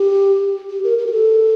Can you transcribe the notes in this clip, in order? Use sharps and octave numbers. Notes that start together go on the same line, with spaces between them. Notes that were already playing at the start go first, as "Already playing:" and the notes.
Already playing: G4
G4
A#4
A#4
G4
A4